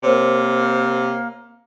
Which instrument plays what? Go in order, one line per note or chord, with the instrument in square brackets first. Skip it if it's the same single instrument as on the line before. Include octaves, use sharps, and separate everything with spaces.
[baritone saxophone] C3 [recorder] A#3 [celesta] A#4 C5 C#5